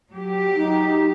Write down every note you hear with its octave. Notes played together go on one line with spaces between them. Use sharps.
F#3 G4
D#4